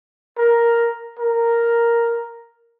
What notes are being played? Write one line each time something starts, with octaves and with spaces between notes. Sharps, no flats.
A#4
A#4